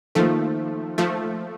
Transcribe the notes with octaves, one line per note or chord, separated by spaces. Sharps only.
D#3 F3 A3 A#3 F4 A4 C5
F3 A3